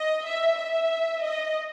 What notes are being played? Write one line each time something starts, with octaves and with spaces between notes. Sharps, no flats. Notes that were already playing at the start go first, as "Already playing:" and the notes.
Already playing: D#5
E5
E5
D#5